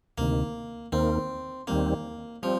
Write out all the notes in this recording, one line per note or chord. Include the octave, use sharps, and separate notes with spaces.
D2 C3 D#3 A#3
D#2 D#3 A#3 C4
D#2 D#3 G3 A#3 C4
F3 G3 C4